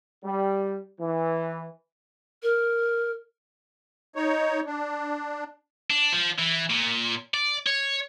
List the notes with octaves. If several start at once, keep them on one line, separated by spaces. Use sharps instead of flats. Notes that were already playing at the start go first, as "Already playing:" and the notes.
G3
E3
A#4
D#4 C#5
D4
D4
F3
E3
A#2
D5
C#5